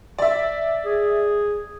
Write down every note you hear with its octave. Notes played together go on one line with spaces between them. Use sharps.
D5 E5
G#4